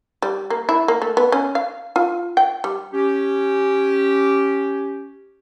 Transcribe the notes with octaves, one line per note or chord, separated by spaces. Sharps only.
G3
A#3
E4
A#3
A3
B3
C#4
F5
F4
G5
G3
C#4 G4